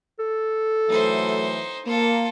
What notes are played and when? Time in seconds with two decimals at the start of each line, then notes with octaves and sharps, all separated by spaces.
0.19 A4
0.89 E3 F#3 A3 D#4 C5
1.85 A#3 F4 A4